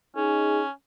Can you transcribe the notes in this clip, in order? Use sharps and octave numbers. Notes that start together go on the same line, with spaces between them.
C#4 D#4 G#4